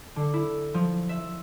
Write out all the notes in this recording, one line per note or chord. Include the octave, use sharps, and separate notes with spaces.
D3
E4
F3
E5